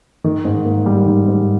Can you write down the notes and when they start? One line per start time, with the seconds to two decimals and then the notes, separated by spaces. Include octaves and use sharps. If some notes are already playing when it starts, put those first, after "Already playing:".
0.24 D#3
0.45 G#2
0.65 A#3
0.86 G3
1.06 D#3
1.28 G#2